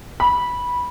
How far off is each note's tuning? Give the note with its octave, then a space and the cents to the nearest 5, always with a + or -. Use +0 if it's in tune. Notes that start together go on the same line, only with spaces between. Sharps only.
B5 -10